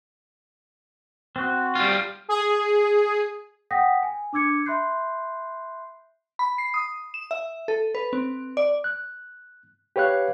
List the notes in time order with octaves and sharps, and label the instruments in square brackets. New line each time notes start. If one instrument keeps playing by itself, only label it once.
[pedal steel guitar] C4 F#4
[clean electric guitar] G3 F4
[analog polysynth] G#4
[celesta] F#5 G5 D#6 G6 A#6 B6
G#5
D4 D6 E6 G#6 C#7
E5 B5 C6 F#6 G6 C7
[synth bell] B5
C7
D#6
E7
E5
A4
B4
C4
D5
[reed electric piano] F#6
G4 B4 C#5 F5 F#6